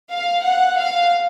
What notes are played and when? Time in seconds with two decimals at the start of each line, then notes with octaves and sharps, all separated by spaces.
0.11 F5
0.44 F#5
0.78 F5